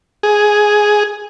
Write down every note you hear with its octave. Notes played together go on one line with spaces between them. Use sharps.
G#4